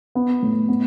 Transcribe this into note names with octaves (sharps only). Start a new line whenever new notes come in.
B3
A2
B3